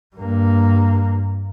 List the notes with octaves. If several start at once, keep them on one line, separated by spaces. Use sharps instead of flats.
G2 A#3